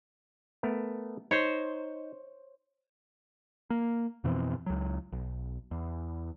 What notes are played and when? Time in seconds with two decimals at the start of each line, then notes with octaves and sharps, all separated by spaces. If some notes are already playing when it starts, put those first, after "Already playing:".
0.63 A3 B3 A#4
1.31 D#4 C5 C#5
3.70 A#3
4.24 F2 B2 E3 C4
4.66 C#2 F#3
5.12 B1
5.71 E2